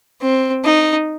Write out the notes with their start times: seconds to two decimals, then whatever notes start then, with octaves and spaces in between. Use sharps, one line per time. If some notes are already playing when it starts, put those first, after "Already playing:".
0.21 C4
0.64 D#4